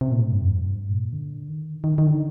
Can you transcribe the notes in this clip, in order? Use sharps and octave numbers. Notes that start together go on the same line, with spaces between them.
C3
A#2
A2
G2
F2
G2
A#2
D3
D#3
D#3
D#3
D3